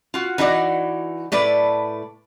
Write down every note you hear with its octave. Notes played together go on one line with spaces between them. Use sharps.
F4 F#4
E3 D#4 F#4 D5
A2 A3 B4 D5